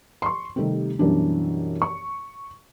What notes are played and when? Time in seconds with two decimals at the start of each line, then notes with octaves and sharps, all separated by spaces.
0.22 C6 C#6
0.56 C3 D#3 G3 A3 C4
0.99 F#2 B2 E3 G3 D4
1.82 C#6